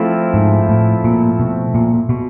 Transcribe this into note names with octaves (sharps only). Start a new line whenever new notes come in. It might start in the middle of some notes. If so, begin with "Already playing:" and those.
Already playing: F3 A3 C4 E4
G#2
A2
A#2
B2
A#2
B2